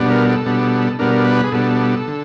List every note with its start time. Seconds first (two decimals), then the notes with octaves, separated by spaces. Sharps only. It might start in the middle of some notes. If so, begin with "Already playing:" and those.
Already playing: B2 G3 B3 D4
0.10 A#4
0.28 A4
0.46 B2 G3 B3 D4
0.99 B2 G3 B3 D4 A#4
1.25 B4
1.44 G#4
1.52 B2 G3 B3 D4 A4
2.08 D3